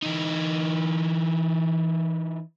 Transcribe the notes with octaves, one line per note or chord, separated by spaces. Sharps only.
E3 D#4